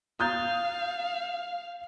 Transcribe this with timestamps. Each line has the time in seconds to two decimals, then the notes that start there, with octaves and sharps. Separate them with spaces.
0.20 F5 D#6 G6 A6